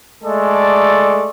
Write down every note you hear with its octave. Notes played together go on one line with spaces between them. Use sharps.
G#3 A3 A4 D5